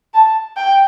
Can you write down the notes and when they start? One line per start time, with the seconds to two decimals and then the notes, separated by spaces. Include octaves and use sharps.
0.14 A5
0.56 G5